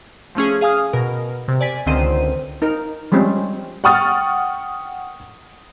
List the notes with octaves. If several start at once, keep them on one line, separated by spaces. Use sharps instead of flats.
F3 A3 C#4 G#4
G#4 F5 G#5 D#6 F6
B2 A#4
C3
D5 G#5 B6
C#2 D3 D#3 C4 C5 D#7
D#4 A#4
F3 G3 G#3 C4 C#4
F#5 G5 C#6 D#6 F6 A6